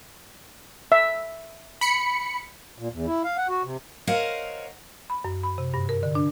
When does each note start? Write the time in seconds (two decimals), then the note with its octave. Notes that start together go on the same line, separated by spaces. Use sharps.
0.92 E5
1.81 B5 C#7
2.79 A#2
2.92 E2
3.06 E4
3.24 F5
3.37 F#5
3.49 F#4
3.64 C3
4.07 A#4 C5 C#5 D#5 F5 F#5
5.10 B5
5.25 F#2
5.43 B5
5.58 C3
5.74 G2
5.89 A#4
6.03 D3
6.15 D4